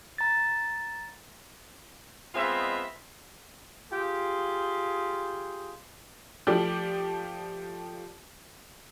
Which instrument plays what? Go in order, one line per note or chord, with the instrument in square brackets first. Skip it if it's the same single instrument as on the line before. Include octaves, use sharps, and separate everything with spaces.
[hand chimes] A#5 A6
[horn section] G#3 B3 C4 F4 D#5 E5
F4 G4 G#4
[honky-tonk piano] F3 A3 G4 D5